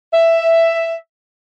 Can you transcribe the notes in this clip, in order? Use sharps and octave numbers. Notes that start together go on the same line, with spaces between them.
E5